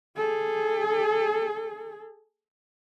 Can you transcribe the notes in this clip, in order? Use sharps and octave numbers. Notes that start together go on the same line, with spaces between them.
G#4 A4